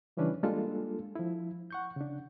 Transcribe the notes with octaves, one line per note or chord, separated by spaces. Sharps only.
C#3 E3 G3 C#4 D4 B4
G3 G#3 A#3 D4 F4 A4
F3 E4
F#5 C#6 G6
C#3 D4